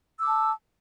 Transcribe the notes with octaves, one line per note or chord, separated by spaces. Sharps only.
A5 D6 E6